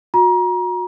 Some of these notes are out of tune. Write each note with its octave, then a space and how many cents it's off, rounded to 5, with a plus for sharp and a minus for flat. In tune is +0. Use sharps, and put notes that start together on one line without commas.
F#4 -35 A#5 +30